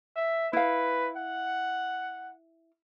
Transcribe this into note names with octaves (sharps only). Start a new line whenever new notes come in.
E5
E4 B4 F5
F#5